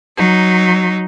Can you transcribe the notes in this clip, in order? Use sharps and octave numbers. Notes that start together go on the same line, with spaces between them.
F#3 D#4